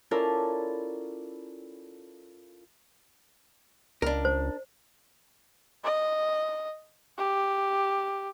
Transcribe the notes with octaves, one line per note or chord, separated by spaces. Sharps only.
C#4 E4 F4 A4 A#4 D5
C#2 D4 A#4
C5
D#5
G4